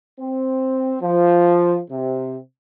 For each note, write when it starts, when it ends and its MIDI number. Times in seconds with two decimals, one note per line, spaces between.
0.20 0.95 60
1.01 1.79 53
1.90 2.37 48